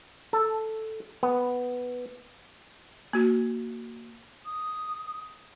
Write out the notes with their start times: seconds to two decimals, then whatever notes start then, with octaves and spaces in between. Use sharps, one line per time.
0.33 A4
1.23 B3
3.13 A#3 F#4
4.46 D#6